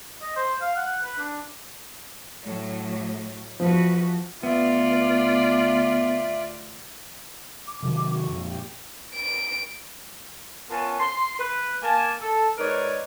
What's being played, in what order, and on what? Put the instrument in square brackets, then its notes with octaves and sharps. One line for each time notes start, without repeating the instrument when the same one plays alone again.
[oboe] D#5
C5
F5
F#5
B4
D4
[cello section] A2 F#3
[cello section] E2 F#4 B4 [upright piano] F3
[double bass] D2 [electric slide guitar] B3 [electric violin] F4 D5 [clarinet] E5
[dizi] D6
[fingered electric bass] C3 D#3 F#3
[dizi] F#4
[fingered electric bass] F2 A#2
[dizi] G4
[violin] D7
[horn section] B3 C#4 F4 A#4 G#5 A5
C6
B4
A#3 G#5 A5
A4
G#2 D#4 A#4 B4 C#5 D5